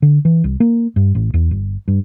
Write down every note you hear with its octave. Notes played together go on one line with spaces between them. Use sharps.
D3
E3
C2
A#3
G2
A1
E2
G1
G2